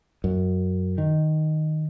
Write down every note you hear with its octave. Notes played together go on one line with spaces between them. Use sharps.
F#2
D#3